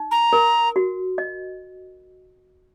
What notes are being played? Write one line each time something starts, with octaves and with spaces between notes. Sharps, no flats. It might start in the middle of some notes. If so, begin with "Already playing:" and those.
Already playing: D#4
A#5
A#4
F#4
D#5